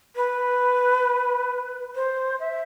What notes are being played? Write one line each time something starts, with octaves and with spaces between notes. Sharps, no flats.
B4
C5
E5